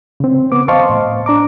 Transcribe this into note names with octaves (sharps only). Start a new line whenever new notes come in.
C#3 C4
B3 D6
C5 D#5 F5 A5 C6 C#6
A2
D4 A#5 D6